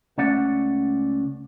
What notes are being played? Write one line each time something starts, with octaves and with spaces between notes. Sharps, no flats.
C#2 A3 C#4 D5 F#5